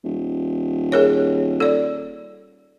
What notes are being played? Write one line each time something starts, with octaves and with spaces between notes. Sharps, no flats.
D#1
G#4 A#4 C#5
A4 D5